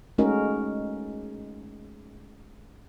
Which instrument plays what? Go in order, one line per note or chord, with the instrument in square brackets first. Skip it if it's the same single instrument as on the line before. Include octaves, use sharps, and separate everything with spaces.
[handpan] G#3 A3 C#4 D#4 F#4 A#4